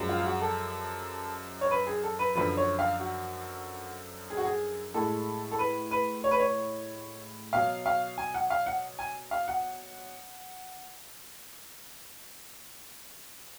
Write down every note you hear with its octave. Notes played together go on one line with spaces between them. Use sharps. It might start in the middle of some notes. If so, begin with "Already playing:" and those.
Already playing: F#2 F3 G#3
F4
G#4
F#4
A4
C#5
B4
G#4
A4
B4
F#2 D3 F3 B4
C#5
F5
F#4
G#4
F#4
G#4
A2 G#3 A4
A4
B4
B4
C#5
B4
C#5
B2 F#3 F5
F5
G#5
F#5
F5
F#5
G#5
F5
F#5